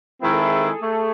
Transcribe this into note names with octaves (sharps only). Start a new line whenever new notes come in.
D#3 G#3 C4 E4 A#4
A4
G#4
A4
A3